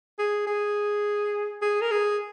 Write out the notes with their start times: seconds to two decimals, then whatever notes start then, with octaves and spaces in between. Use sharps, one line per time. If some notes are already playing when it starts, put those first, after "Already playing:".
0.19 G#4
0.47 G#4
1.62 G#4
1.81 A#4
1.91 G#4